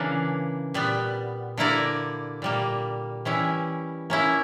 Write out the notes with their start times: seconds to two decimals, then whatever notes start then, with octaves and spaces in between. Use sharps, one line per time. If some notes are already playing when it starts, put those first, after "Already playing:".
Already playing: C#3 E3 A#3 D4
0.74 A#2 G3 B3
1.57 D3 A#3 E4 A#4 D5
2.42 A#2 G3 A#3
3.25 E3 G3 C#4 E4
4.10 A#3 C#4 E4